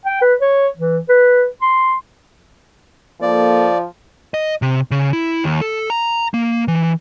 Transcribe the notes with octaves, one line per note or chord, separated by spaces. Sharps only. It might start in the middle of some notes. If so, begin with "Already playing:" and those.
G5
B4
C#5
E3
B4
C6
F3 A#3 A4 D5
D#5
C3
C#3
E4
D#2
A4
A#5
A#3
E3